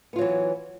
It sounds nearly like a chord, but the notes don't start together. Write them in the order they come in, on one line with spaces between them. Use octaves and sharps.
B3 F4 F#3 E3